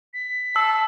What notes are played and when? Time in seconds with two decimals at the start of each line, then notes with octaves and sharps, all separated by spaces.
0.14 B6
0.56 A5 E6